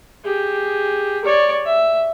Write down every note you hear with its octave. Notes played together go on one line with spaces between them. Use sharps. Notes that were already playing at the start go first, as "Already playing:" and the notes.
G4 G#4
C#5 D5
E5